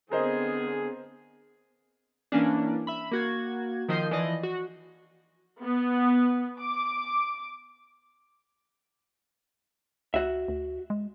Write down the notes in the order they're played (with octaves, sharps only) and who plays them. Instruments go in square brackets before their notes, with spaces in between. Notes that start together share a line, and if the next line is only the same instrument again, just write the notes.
[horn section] D3 G#4 [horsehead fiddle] B3 C4 [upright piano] A#4 C5 D#5
[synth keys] E3 A#3 C#4 D4
E5 B5
A#3 F#4 G#6
D#3 F3 D#5 G6 C7
E3 F3 D5 D#5
F#4
[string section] B3
D6
[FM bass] C#2 [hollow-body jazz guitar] F#4 E5
[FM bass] D2
G#3